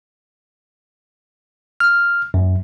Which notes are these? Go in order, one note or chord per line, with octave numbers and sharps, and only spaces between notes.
F6
F#2